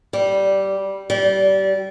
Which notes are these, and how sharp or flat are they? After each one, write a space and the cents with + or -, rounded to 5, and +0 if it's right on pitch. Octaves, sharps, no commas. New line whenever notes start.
G3 -10
G3 -25